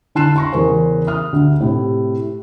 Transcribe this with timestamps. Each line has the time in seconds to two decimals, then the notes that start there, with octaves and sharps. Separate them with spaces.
0.15 D3 E4 A5 F#6 C7 E7
0.36 C6 C#6 A#6
0.52 E2 C#3 A#4 C5 G#5
1.07 D#6 F6
1.33 D2
1.60 A2 C3